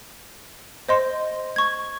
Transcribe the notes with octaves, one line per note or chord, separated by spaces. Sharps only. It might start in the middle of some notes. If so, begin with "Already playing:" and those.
C5 D#5 C6
C#6 G#6